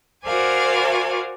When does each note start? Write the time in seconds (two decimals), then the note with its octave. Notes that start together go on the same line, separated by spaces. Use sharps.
0.25 F#4 A#4 C5 D5 F5 G#5